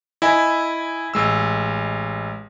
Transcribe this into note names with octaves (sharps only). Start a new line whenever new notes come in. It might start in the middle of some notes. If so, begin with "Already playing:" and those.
E4 D#5 G#5 B5
A1 G#3 E6